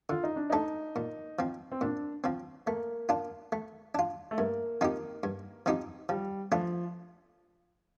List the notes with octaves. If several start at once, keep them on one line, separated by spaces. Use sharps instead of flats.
D3 F4
D#4
D4
A3 D4 D#4 A4
A#2
F3 C4
C4
A#2 D4
F3 C4
A3 A#3
D4 F4
A3
D4 F4
A3
G2 A#3
F3 C4 D#4 G4
G2
F3 C4 D#4 G4
F3 G3
F3 A3 D4 F4